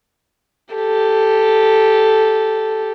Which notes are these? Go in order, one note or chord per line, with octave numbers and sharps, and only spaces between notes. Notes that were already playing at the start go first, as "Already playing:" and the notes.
G4 A4